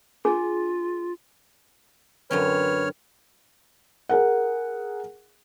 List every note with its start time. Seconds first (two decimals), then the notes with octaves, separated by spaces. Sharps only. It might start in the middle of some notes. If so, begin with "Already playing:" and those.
0.25 D4 F4 G#4
2.31 F#2 D3 C4 B4 C#5 F6
4.09 G#4 A#4 F#5